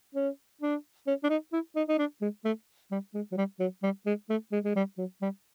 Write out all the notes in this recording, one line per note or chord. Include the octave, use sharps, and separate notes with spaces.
C#4
D4
C#4
D4
D#4
E4
D#4
D#4
D4
G#3
A3
G3
G#3
F#3
G3
F#3
G3
G#3
A3
G#3
G#3
G3
F#3
G3